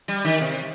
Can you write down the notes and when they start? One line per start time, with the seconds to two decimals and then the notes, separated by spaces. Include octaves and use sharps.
0.08 G3
0.25 D#3
0.41 C3